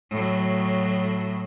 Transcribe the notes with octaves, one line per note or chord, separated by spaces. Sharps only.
A2 F#3